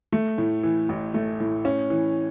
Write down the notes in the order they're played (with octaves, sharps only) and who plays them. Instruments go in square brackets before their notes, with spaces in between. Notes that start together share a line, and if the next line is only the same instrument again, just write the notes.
[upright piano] A3
A2
E3
A1
A3
A2
C#4
E3